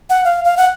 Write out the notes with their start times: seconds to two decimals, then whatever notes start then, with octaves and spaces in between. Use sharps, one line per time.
0.10 F#5
0.25 F5
0.45 F5
0.57 F#5